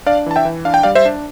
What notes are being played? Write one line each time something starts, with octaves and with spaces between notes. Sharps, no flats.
D4 D5 F5
E3 A5
E5 G5
E3
D4 F5
G5
G3 D5 F5
C5 E5
D4